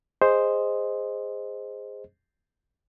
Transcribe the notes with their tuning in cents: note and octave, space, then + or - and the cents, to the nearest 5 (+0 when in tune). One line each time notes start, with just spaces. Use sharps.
G#4 -15 C5 +0 D#5 +0